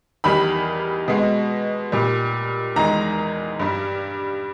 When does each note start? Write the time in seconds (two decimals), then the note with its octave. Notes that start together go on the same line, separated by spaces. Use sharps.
0.24 E2 D#3 G3 B5
1.08 B2 G#3
1.92 A#2 G3
2.76 E2 D#3 G#3 A#5
3.59 G2 G3